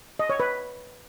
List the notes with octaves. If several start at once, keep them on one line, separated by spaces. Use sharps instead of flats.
D#5
C#5
B4